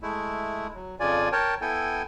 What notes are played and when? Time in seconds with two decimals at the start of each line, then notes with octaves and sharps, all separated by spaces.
0.02 G#3 A3 E4
0.75 F#3
1.00 F2 C#3 F3 F4 D5 G#5
1.32 A#4 C#5 G5 A5
1.61 B3 E4 A4 G5 G#5